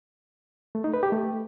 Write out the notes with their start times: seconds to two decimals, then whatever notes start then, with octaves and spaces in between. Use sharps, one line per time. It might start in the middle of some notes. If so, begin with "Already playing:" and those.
0.75 A3
0.84 D#4
0.94 B4
1.03 G4
1.12 A3